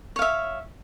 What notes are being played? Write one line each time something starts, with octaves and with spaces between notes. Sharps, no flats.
C#5 E5 F5